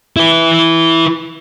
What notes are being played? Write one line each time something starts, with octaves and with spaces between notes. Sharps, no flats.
E4 B4